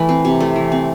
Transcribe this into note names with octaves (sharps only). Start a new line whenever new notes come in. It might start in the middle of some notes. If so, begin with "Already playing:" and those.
Already playing: E3 A3 B4
C4
C3
A3
E3
C4